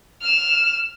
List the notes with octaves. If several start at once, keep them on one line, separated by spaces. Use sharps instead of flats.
F6 E7